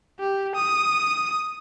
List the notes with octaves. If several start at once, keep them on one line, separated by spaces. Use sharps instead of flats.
G4
D#6